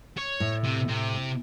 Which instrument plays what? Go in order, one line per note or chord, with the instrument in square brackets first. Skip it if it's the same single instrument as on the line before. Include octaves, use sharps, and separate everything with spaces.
[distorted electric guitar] C#5
[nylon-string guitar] A2
[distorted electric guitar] C3
C3